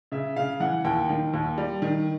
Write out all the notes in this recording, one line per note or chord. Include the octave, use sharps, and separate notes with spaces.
C#3 E5
C#3 F5
E3 F#5
D#2 G5
D#3
D#2
G3
D#3